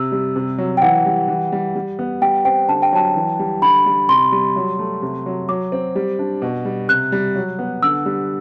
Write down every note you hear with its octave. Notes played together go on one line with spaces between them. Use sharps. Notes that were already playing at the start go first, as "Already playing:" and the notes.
Already playing: C3 E6
G3
C3
F#3
G5
E3 F#5
G3
E3
G3
G3
B3
G3 G5
C4 G5
D3 A5
G5
F#3 A5
E3
G3
D3 B5
G3
C3 C6
G3
F#3
A3
C3
F#3
F#3 D6
C4
G3
D4
B2
G3
C3 F#6
G3
F#3
B3
D3 E6
G3